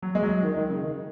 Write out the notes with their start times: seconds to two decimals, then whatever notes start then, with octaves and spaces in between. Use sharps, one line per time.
0.02 F#3
0.15 G#3
0.23 F#3
0.43 D#3
0.56 D#3
0.70 C#3
0.83 D#3